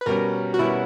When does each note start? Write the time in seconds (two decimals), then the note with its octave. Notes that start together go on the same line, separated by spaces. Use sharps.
0.01 B4
0.06 B2 G3 C#4 A#4
0.54 F#4
0.59 B2 G3 C#4 E4